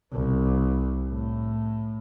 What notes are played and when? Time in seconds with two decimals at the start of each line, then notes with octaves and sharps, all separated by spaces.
0.13 C2
1.08 A2